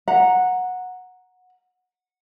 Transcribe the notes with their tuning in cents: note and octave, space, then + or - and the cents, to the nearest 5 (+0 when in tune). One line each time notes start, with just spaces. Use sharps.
F#5 -15 A#5 +0